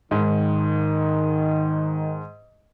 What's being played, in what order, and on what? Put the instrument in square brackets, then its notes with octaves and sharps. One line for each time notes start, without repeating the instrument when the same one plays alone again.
[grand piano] G#2 [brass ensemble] D#3